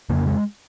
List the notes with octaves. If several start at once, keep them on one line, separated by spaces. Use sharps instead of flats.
F2 C#3 A#3
G#3